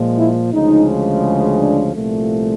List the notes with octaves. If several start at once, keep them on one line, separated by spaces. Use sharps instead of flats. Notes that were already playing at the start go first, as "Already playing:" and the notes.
Already playing: A#2 F3 G#3
E4
D2 C#3 F3 G#3 D#4
D4
C2 A#2 F3 A3